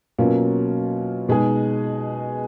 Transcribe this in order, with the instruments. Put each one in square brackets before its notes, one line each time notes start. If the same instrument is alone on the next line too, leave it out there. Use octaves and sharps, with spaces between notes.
[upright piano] B2 F#3 A#3 C#4 F4
B2 G#3 D#4 G#4